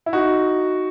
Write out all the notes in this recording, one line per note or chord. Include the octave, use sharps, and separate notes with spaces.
E4
D#4 F#4